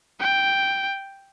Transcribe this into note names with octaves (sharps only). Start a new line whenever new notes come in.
G5